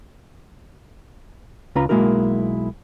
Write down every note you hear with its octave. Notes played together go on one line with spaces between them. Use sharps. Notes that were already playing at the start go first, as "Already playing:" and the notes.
C#2 C#4 F4 B4 A#5
B1 G#3 A#3 E4 F#4 A#4